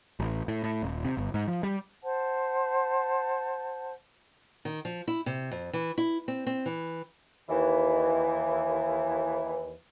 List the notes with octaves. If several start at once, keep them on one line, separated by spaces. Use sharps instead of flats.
A1
A2
A2
D#1
C3
G1
G#2
F3
G3
C5 F#5 A5
D#3
F3
E4
C3
F2
E3
E4
C4
C4
E3
D#2 E3